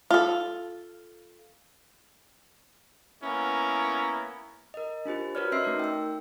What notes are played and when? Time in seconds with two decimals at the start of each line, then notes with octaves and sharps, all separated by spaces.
0.11 F4 A4
3.23 A#3 B3 C#4 E4 A#4
4.74 A#4 D#5
5.05 D4 F4 G4 C5
5.35 F#4 A#4 B4 C#5 D5 F6
5.52 C#4 D#5 E5 C6 E6 C7
5.64 A3 D#4 A#4
5.79 G5 E6